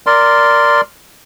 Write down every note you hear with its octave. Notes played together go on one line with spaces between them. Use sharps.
A#4 D5 C6